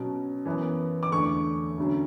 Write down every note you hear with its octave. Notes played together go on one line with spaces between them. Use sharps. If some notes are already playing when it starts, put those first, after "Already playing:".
Already playing: B2 F#3 C#4
F#2 E3 B3
D6
E2 D3 A3 C#6
D2 D3 F#3 C#4